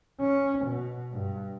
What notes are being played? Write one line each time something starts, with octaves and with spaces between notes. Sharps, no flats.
C#4
B2
G2